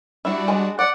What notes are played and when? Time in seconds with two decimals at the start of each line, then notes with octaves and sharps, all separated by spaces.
0.25 G3 D4 E4 F#4
0.48 G#3
0.79 D5 F#5